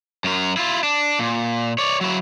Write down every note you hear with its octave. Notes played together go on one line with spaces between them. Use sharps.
F#2 A#4
E4 F4
D4
A#2
C#5 D5
F#3 E4